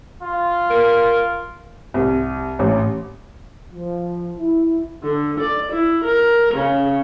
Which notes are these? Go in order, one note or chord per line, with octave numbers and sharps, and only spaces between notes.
F4
A#4
C2
A1
F3
E4
D3
D5
E4
A#4
C#3